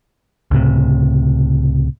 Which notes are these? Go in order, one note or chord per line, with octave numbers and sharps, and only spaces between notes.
C#2 A2 C3